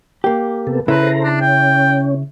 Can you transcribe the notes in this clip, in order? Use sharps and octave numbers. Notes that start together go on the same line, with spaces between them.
A#3 G4
C3 B3 A4
C#3 E4 A4 B4 C5 A#5
D4
C#4 G5